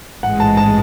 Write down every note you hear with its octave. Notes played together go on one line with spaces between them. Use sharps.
A1 G#2 E3 G#3 F#5
A5
A5